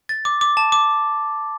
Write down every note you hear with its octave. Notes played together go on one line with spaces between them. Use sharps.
A6
D6
D6
A5
D6